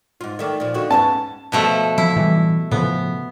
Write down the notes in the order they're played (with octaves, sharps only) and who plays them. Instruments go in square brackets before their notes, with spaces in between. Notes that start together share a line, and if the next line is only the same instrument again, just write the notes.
[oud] G#2 F4
D#3 A3 D5
A#2 F3
D#2 D3 F#4
[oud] G#2 B3 C#4 [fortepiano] A5
[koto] B2 F3 A3
[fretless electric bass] F3 [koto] E4
[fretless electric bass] A2 E3 G3
[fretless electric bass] A2 C#3 F3 [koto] B3